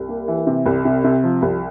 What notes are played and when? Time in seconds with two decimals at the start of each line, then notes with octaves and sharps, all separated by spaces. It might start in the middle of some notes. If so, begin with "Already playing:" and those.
Already playing: C2
0.09 A#3
0.28 E3
0.47 C3
0.66 C2
0.85 C3
1.04 C3
1.23 F3
1.42 C2